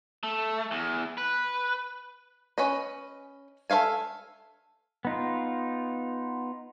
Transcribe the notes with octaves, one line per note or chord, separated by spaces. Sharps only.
A3
E2
B4
C#4 B4 D#5
A4 C5 E5 F5 G#5
B3 D#4 F4